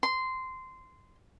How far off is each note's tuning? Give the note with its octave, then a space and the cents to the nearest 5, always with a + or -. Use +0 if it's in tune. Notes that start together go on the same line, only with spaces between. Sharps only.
C6 -15